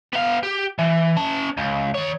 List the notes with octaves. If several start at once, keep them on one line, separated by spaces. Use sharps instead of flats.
B3 F5
G4
E3
C#4 A5
C#2
D#3 C#5